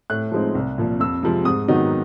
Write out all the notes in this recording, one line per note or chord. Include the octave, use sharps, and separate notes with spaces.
A2 F#6
F3 G#3 C4 D#4
C2
A#2 F3
F2 E6
C3 F3 G#3
G#2 D#6
D#3 F#3 B3 D#4